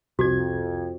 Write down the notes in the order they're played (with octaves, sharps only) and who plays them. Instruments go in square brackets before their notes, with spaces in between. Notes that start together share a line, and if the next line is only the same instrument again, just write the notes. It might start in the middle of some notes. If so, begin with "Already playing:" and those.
[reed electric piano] C2 G#6 [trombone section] F2 [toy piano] F#4 A4